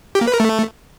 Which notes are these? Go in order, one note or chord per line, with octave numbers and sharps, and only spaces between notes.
G4
A#3
B4
A#4
A3